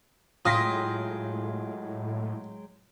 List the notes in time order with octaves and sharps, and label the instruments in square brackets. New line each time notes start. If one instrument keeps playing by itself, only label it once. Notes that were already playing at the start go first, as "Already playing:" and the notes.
[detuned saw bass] A2 [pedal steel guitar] F#3 G#3 G5 [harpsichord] F4 [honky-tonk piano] D#6 A#6 B6